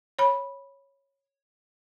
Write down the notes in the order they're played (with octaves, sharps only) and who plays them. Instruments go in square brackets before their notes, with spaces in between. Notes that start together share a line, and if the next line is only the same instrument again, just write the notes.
[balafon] C#5 B5